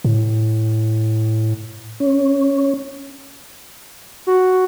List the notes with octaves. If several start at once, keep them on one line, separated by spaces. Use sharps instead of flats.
A2
C#4
F#4